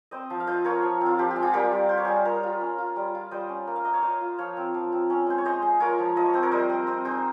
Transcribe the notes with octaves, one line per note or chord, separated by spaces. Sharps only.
C4 C5 D#5
F3
F5
F4 C5 D#5
F4 A#4 C#5
F3
C4
F4
F3 G4
G4
G#3
F4 G#4
G3 G4 A#4
G3
F4 C5
C#5
G3 G#4 C5
F4 A#4 C#5
F4
C#4
F4
G3
F4
G3 C5 D#5
C#4
A#3
F5
A#3 D#5
C#5 F5
F4 C5 D#5
F4
F3 C#5 F5
C4
F3
C4
C#4
G#3 C5
C#5
G#3 C5 D#5
G#3
F4 A#4 C#5
F3
F3 D#5
C#5
C4 C5
A#4 C#5
G3 C5 D#5
C4
C4 C5 D#5
D#4 G#4 C5